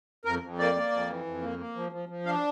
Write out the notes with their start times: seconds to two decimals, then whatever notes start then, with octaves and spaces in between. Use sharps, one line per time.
0.25 F2 A#4
0.42 F2
0.59 A#3 D5
0.75 A#3
0.92 F2
1.09 E3
1.26 F2
1.42 A#3
1.59 A#3
1.75 F3
1.92 F3
2.09 F3
2.26 D4 F5